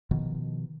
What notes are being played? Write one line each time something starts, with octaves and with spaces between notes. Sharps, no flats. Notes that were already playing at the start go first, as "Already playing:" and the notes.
B2 D#3 F3